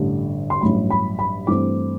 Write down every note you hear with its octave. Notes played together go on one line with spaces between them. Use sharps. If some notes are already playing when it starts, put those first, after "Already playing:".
Already playing: A1 G2 D3 G3
C6
A1 G2 F#3 B5
B5
B5
G2 E3 A3 C4 D6